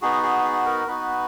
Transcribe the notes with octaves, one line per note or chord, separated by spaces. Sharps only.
B3 D#4 F#4 G#4
G#4
G#4
A#4
B3 D#4 F#4 B4